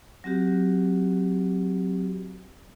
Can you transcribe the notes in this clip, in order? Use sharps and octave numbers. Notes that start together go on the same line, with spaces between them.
F#3 C4 F#4 G4